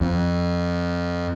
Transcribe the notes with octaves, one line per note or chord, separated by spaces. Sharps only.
F2